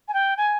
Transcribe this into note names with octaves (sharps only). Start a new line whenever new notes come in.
G#5
G5
G#5